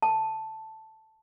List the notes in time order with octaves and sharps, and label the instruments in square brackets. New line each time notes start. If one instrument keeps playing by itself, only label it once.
[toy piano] A5